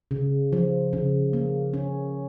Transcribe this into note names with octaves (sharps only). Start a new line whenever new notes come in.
C#3
F3
C#3
A#3
C#4